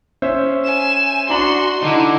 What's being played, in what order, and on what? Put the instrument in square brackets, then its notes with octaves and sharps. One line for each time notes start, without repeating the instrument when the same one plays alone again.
[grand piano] C#4 C5 E5
[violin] G#5 E7
[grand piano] D4 A#5 F#7 [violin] F#4 C6
[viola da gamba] D3 E4 [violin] D#4